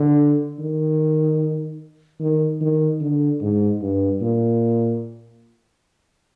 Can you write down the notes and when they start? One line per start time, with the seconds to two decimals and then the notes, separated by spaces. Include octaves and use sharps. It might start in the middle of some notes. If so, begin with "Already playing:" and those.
Already playing: D3
0.59 D#3
2.20 D#3
2.61 D#3
3.01 D3
3.41 G#2
3.81 G2
4.21 A#2